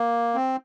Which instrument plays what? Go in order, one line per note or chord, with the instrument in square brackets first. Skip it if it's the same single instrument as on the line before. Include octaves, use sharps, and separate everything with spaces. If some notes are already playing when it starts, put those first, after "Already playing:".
Already playing: [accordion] A#3
C4